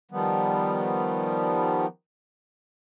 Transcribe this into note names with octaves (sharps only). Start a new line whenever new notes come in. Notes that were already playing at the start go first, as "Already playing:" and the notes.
D#3 F3 G3 B3